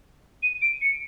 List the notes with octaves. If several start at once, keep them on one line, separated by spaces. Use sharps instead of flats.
D#7
D7
C#7